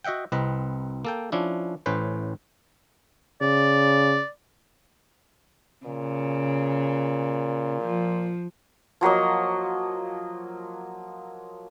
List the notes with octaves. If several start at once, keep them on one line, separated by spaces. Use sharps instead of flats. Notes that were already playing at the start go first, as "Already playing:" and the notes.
F#4 D#5 E5 F#5 G5
C2 C4 B4 D#5
A#3 A4 G5
F3 C#4 D4 E4
A1 A2 C#4 B4 C5
C#3 D5
A#2 C#3
F3
F3 F#3 A#3 D#5